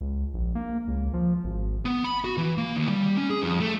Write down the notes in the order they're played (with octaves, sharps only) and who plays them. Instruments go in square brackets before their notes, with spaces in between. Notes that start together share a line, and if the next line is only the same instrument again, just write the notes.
[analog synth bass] C#2
A#1
A#3
C#2
F3
G#1
[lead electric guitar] B3
B5
F#4
E3
A#3
D#2
G3
C#4
G#4
F2
A3